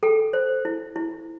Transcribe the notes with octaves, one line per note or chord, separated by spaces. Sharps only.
A4 G5
C5
E4
E4